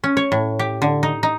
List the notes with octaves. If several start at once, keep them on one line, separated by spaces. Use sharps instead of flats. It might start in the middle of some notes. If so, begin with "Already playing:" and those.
C#4
C#5
A2
G4
D3
D#4
D#4